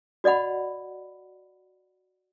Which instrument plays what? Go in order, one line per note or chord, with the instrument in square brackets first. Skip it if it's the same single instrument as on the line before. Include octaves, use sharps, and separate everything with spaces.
[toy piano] F#4 D5 D#5 F#5 B5